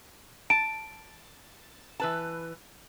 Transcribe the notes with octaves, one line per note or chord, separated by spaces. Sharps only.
A5 D7
E3 B4 A5